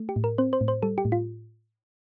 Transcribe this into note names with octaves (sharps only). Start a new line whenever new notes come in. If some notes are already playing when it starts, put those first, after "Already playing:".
Already playing: A3
G4
A2
A#4
C4 C5
C5
A2
C5
G3 A4
G4
A2
F4